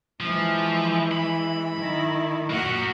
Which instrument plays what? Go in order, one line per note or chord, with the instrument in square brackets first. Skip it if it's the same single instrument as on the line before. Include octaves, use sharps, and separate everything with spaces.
[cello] E3 G#3 [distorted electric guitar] F3
[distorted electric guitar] B5
[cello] D#3 E4
[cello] A#2 F#5 [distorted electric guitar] F#4 A#4